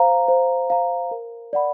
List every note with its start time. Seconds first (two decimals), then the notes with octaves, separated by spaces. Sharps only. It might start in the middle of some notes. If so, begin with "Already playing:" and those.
Already playing: C5 F5 A#5
0.28 C5
0.70 F5 A#5
1.11 A#4
1.53 D5 F#5 B5